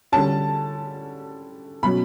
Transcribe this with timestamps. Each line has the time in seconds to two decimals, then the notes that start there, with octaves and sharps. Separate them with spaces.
0.12 D3 G3 C#4 A5
1.83 B2 F#3 C#4 B5